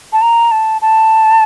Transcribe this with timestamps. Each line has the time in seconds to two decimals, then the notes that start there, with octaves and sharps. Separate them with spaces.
0.13 A5
0.22 A#5
0.51 A5
0.82 A5